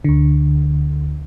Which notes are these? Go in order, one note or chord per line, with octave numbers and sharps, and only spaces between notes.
D2 D3